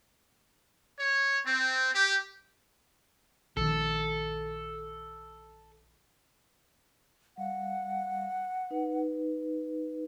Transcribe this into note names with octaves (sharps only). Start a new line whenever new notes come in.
C#5
C4
G4
A#1 D#3 A4
G3 F5 F#5
D#4 B4